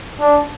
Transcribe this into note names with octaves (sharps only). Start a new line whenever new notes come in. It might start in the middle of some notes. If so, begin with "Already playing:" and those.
D4